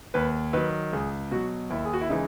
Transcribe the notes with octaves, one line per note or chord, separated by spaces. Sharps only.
D#2 B4
D#3 F#3 B4
C#2 G#4
B2 F#3 F#4
D#2 E4
G#4
F#4
E4
C#3 E3 G#3 D#4